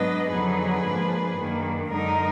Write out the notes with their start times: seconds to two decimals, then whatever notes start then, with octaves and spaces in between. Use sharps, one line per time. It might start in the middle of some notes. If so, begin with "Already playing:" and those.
Already playing: G#2 F#3 B3 D4 B4 D#5
0.31 F2 D3 F#3 B3 D#4 G#4 B4
0.84 G#2 F3 A#3 D4
1.36 F#2 D#3 A#3 D4
1.88 F#2 D3 G#3 D#4 A#4